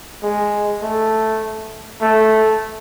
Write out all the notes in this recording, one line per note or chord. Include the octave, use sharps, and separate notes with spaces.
G#3
A3
A3